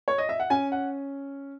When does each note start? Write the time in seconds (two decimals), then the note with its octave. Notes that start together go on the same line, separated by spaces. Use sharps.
0.08 C#5
0.18 D#5
0.29 E5
0.40 F#5
0.50 C#4 G#5
0.72 F#5